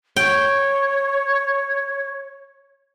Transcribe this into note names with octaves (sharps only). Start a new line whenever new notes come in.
C#5 G5